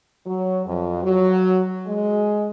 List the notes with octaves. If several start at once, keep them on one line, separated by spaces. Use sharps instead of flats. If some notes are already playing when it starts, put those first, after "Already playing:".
F#3
F2
F#3
G#3